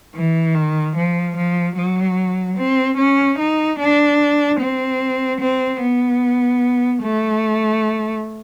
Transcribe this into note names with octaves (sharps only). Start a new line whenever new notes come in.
E3
D#3
F3
F3
F#3
C4
C#4
D#4
D4
C4
C4
B3
A3